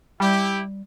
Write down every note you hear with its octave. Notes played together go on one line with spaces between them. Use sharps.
G3 E4 G4